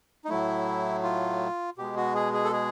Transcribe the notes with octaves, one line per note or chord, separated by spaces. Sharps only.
D#4
A2 F#3 A3 E4
F4
B2 G#3 G4
F#4
G#4
G#4
A4
G#4